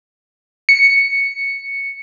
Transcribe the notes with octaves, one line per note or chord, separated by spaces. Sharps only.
C#7